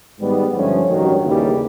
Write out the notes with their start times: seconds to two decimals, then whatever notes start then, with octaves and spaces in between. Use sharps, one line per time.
0.20 G#2 D#3 G3 B3
0.54 G2 D3 F3 A3 C#4
0.89 A1 G2 D#3 F#3
1.25 D#2 C#3 E3 G3